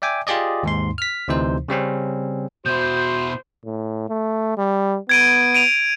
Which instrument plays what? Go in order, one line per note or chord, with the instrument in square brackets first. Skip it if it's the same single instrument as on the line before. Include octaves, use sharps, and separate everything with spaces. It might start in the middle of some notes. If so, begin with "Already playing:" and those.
[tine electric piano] D5 E5 G5 G#5 D6
F4 G4 G#4 D5 D#5
D#2 G#2 C6
F6 B6
D2 C3 E3 D#4 C5
C#3 G3 C4 C#4
[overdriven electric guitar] B2 E4 [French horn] F#4 [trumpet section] C5 [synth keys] G6
[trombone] A2
A3
G3
[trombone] B3 [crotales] G#6 D7 D#7
[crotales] D7 D#7 F7